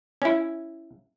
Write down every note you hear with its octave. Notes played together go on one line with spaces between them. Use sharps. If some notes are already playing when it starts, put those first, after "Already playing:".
C#4 E4